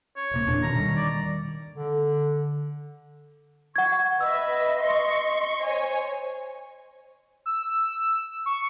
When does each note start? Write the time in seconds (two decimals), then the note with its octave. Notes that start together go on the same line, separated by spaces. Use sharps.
0.17 C#5
0.31 D#1 C3 A#3
0.47 E2 A#2 D4
0.62 B2 D3 D#3 A#5
0.76 D#3 G3
0.97 D5
1.76 D3
3.76 F#5 C#6 G#6
4.21 B4 D#5 E5 E6
4.82 C6 C#6
5.60 C5 C#5 G#5
7.46 E6
8.46 C#6